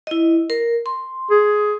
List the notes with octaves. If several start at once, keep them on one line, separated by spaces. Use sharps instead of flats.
E4 D#5
A#4
C6
G#4